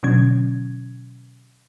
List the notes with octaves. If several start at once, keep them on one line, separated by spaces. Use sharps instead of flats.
B2 D3 F#3 C#4 G#6